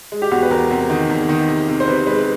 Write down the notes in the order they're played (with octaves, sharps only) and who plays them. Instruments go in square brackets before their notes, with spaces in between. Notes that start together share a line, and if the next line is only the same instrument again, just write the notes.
[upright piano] G#3
[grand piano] G4
[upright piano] E2 [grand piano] F#4
[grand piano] B4
[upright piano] E2 [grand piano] A#4
[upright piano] C3
D#3
E2
D#3
C3
C3
[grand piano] C5
[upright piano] C3 [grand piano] B4
[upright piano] G#3 [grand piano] B4